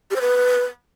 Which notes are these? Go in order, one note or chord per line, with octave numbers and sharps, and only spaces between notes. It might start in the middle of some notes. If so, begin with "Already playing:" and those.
G4
C5
B4